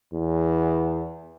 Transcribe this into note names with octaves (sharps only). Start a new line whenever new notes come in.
E2